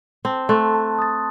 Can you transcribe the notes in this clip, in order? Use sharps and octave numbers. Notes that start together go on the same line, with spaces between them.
C4 A5
A3 C6 F#6 A6
A5
D#6 A6